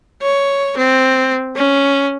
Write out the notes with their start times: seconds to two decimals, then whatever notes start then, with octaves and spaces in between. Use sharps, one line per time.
0.22 C#5
0.78 C4
1.56 C#4